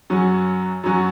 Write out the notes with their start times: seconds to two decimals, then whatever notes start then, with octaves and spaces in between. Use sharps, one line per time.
0.10 F#2 F#3 C#4
0.83 F#2 F#3 C#4